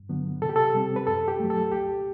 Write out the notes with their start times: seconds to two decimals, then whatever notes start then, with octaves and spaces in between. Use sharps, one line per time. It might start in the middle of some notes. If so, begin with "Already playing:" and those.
Already playing: G2
0.09 D3 F#3 B3
0.42 C3 A4
0.49 G4
0.56 A4
0.74 G3 C4
0.96 B4
1.06 F#2 A4
1.28 G4
1.40 F#3 A3
1.50 A4
1.71 C2 G4